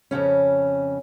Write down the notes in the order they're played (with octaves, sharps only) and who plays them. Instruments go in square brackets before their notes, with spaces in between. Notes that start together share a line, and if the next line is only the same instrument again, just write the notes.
[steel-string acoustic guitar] F2 G#2 C#3 C#4